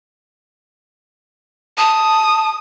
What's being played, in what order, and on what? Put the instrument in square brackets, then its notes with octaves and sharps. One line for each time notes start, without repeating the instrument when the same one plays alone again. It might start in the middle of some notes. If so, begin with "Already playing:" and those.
[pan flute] A5 [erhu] D#6